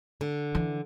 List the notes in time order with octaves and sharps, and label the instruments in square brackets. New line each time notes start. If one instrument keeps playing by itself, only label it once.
[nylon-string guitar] D3
[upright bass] E3